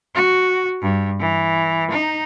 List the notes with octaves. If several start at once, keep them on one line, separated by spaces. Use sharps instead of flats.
F#4
G2
E3
D#4